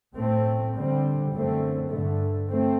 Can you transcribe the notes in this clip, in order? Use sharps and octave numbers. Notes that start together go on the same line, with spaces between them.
A2 A3 C4
D3 G3 C4
F#2 D3 A3 C4
G2 D3 A3
A3 C4